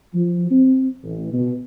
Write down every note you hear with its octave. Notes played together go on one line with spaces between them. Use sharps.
F3
C4
A1
B2